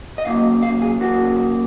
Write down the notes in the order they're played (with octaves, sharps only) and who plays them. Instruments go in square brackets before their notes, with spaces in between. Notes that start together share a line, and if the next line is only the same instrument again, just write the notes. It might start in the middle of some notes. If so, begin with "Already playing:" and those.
[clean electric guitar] D#5
D#2 C#3 F#3 A#3 F5
F5
G#4
D#2 C#3 F#3 A#3 F#4